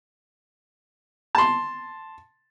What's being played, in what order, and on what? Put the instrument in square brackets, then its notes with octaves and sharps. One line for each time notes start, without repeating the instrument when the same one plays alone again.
[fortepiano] A5 C6